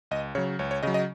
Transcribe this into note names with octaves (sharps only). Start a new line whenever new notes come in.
C#2 D#5
C#3 F#3 C#5
C#2 C#5
C#5
C#3 F#3 D#5
D#5